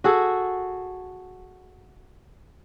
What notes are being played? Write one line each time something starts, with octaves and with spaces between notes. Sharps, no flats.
F#4 G#4 A4